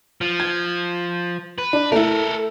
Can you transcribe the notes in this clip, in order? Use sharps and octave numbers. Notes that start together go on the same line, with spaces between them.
F3
G#6
B4
D4
A3 E4 A4 A#4